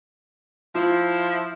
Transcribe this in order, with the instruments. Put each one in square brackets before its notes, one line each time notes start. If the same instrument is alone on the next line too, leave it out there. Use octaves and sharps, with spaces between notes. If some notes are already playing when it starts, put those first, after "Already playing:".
[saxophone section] F3 E4 [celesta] F4